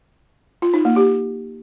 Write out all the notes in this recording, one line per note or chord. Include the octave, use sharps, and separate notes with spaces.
F4
D#4
A#3
G4